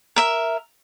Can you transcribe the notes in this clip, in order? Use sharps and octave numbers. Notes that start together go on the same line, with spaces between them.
A#4 E5